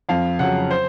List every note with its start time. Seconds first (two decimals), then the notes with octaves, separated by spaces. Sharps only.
0.09 F2 F5
0.39 C#3 F#3 F#5
0.71 C5